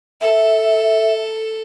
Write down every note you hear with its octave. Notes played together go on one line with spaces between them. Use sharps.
A4 E5